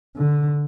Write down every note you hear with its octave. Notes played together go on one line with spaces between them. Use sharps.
D3